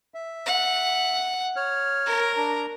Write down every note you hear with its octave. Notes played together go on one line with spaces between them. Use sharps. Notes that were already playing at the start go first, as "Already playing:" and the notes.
E5
F#5
C#5 F6
A#4
D4 A#5